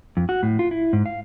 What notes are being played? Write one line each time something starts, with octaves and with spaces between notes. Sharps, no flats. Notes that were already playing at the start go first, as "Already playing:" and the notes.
F2
F#4
A2
F4
E4
G#2
F5